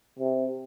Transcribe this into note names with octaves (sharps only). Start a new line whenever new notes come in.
C3